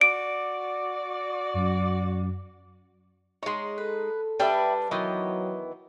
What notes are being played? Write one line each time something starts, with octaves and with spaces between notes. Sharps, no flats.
F#4 D5 D7
F#2
G#3 D#4 C#5 C6
A4 B4
G3 D4 B4 D5 E5 G5
D#3 E3 F#3 B3 D#5 G5